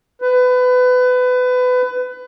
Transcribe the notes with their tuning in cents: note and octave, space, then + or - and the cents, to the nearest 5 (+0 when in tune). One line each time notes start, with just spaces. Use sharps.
B4 +25